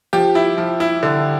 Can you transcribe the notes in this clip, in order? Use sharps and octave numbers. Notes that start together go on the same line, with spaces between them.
F3 G4
E4
F3
E4
D3